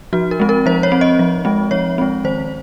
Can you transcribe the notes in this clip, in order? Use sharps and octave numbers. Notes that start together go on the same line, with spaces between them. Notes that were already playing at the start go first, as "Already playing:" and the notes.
F3 F#4
A#4
G#3 C4
A#4
F3 C5
C#5
C4
D#5
F3
G#3 C4
F3 C#5
G#3 C4
D#3 C5